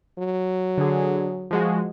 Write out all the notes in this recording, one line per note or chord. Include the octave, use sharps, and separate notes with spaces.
F#3
D3 G#4
F3 G#3 F#4